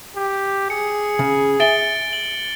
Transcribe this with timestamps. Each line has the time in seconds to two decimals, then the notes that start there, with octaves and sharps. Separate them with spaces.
0.16 G4
0.70 G#4 C#7
1.19 C#3
1.60 E5 G#5 A6 D7 G7
2.13 F#7